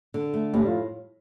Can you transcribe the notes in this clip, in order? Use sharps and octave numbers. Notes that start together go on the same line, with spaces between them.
D3
A3
A2 G3
F3 F4